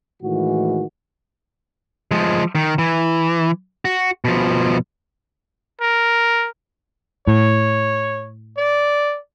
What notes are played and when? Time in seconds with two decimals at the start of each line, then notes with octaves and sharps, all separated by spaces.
0.23 A2 D#3 E3 G#3 F#4
2.11 F3 G#3
2.55 D#3
2.79 E3
3.85 F#4
4.25 B2 F3
5.81 A#4
7.27 A2 C#5
8.57 D5